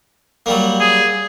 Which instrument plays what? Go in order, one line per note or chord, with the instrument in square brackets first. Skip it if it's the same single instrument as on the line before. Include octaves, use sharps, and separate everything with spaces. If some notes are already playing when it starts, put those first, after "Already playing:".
[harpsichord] F#3 G3 A#3
[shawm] G#4